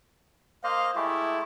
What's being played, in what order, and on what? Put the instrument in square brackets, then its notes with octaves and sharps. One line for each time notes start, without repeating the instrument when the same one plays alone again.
[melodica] A#3 C5 D#5 [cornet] F5
[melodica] G#3 A3 G4 [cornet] E4